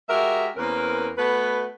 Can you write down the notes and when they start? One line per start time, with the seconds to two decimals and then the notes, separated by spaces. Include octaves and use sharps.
0.09 G#3 F#4 G4 A#4 E5
0.57 E2 A#3 C4 C#4 A#4 B4
1.17 A3 B3 F#4 B4